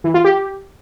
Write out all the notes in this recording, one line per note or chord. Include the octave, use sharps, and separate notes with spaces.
E3
F4
G4